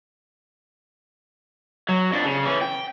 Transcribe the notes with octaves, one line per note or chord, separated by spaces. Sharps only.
F#3
F2 D4
C#3
E3 C#4
G5